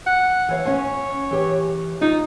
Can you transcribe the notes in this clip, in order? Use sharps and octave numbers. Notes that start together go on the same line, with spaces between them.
F#5
E3 C#5 F5
C#4 C#5 G#5
E3 G4
D#4 F4